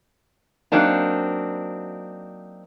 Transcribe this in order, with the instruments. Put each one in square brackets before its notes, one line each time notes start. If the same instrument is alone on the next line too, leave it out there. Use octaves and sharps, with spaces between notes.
[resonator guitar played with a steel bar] F#3 A#3 C4 D4 D#4